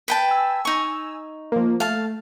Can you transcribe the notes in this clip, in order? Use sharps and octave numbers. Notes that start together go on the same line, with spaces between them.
B4 G5 A5
G#5 E6
D#4 C#6
F3 A#3
A3 F5 A5